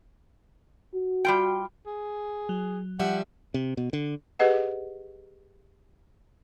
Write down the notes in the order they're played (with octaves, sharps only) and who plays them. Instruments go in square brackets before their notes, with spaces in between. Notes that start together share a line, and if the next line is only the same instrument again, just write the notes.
[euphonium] F#4
[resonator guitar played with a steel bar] G3 F4 G5
[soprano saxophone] G#4
[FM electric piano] F#3
[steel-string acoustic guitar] F3 G3 E5 [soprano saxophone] F#5
[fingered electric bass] C3
B2
D3
[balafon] G4 G#4 B4 D#5 F#5